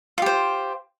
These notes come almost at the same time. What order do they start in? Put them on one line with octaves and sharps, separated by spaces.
F4 G4 C5